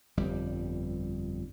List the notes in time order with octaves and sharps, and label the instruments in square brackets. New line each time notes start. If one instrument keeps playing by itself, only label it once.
[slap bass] G1 F2 G3